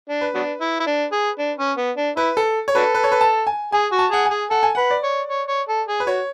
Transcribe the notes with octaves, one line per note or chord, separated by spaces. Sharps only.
D4
B4
F#3 B3 D4
E4
E4
D4
G#4
D4
C#4
B3
D4
E4 B4
A4
C#5
D4 F#4 A4 B4
B4
C#5
B4
A5
G#5
G#4 G#5
F#4
A5
G#4 F#5
G#5
G#4
A4 F#5
G#5
B4 F#5
D5
C#5
C#5
C#5
A4
G#4
B4
F#4 C#5